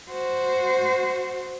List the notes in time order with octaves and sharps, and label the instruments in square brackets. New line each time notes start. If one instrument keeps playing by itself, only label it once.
[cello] F#4 C5